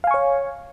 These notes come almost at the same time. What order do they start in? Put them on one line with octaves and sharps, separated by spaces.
F5 G#5 C#6 C#5